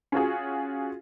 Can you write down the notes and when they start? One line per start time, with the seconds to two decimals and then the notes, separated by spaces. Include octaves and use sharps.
0.12 C#4 F4 F#4 G#4